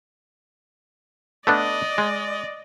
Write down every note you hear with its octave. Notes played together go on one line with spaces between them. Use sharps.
A3 B3 D4 D5 D#5
G#3